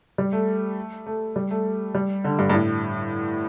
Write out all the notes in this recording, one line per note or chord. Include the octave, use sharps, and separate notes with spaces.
G3
A3
A3
G3
A3
G3
D3
G2
G2
A2